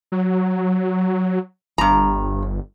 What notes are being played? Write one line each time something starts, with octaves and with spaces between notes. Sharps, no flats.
F#3
G1 G2 A#5